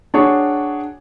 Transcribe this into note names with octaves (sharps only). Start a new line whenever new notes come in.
D4 F#4 G#4 C#5